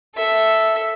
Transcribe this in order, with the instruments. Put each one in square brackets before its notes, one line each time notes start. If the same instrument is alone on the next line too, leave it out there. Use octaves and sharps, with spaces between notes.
[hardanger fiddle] A4 E5